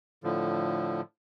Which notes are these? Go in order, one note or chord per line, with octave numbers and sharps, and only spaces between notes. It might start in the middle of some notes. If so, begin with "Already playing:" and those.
A2 D3 F3